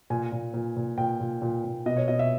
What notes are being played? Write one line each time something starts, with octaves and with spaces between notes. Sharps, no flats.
A#2 G#5
A#2
A#2
A#2
A#2 G5
A#2
A#2
A#2
B2 D#5
C#5
B2 D#5
E5